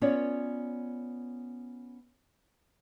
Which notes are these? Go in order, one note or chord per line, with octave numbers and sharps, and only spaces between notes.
B3 C#4 F4 C#5 D5